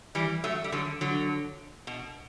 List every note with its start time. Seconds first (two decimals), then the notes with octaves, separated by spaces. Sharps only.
0.15 E3 G3
0.44 F#3 A3
0.64 G3
0.72 D3 F#3
1.01 D3 F#3
1.87 B2